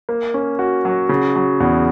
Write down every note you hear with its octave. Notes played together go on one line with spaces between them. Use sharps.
A#3
C#4
F#4
F#3
C#3
F#3
E2